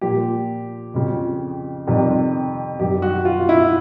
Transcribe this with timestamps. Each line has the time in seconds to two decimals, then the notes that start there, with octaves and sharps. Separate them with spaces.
0.01 A#2 F3 G4
0.94 F2 C#3 F3
1.87 F2 C3 D#3 G3
2.79 F#2 D#3 G3 G4
3.02 F#4
3.25 F4
3.49 E4